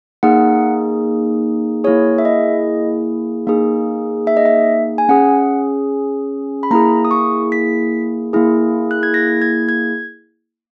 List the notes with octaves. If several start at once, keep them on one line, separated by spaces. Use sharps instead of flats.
A#3 D#4 G#4 F#5
A#3 E4 G#4 C#5
E5
D#5
A#3 D#4 G#4
E5
D#5
E5
G#5
C#4 G#4 F#5
B5
A#3 E4 G#4 A#5
D#6
C#6
B6
A#3 E4 G#4
F#6
G#6
A#6
G#6
G#6